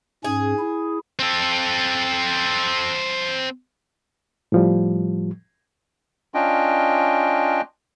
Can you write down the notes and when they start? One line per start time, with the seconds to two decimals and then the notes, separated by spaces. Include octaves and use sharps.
0.24 G#2 C#4 G#4
0.59 E4
1.19 C4 A4
4.52 A2 F3 G3
6.34 C#4 D4 F4 D#5 G5